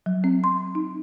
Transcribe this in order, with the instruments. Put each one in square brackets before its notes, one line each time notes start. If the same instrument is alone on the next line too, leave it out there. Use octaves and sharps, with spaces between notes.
[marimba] F#3
C4
C6
D#4